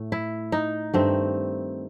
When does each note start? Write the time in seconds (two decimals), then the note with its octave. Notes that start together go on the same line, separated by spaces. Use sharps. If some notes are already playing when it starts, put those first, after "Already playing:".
Already playing: A2 A3
0.12 E4
0.52 D#4
0.94 G2 D#3 A3 C4